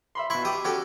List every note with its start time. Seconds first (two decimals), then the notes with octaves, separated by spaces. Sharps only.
0.15 E5 B5 C6
0.30 B2 E4 B5 C#6
0.45 G4 D#6
0.65 C#4 F#4 G4 A4